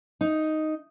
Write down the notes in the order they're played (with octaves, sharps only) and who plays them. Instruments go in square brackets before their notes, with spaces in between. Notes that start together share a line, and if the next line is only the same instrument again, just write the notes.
[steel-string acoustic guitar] D#4